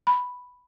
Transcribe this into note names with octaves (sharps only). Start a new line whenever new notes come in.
B5